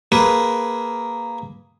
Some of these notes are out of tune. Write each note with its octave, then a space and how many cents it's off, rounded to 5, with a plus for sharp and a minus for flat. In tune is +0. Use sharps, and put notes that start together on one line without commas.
A#3 +0 G#4 +0 B4 +0